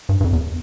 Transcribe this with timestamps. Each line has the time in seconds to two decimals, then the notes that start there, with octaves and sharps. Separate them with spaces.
0.09 G2
0.21 G2
0.24 F2
0.33 E2